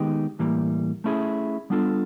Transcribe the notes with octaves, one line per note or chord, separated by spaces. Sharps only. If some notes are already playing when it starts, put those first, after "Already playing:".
Already playing: D#3 G#3 B3 D#4 G4
A2 E3 G3 A#3
A3 C#4 E4 G#4
G3 B3 D4 F4 A4